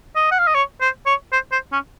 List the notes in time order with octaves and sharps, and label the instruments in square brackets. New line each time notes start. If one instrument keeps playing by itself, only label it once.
[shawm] D#5
F#5
F5
D#5
C#5
C5
C#5
C5
C5
C#4